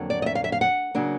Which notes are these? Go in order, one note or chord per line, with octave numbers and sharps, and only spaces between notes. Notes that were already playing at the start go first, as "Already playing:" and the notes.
Already playing: F2 D3 F#3 A#3 D4
D5
D#5
E5
F5
E5
F5
F#5
C#3 F#3 A#3 D4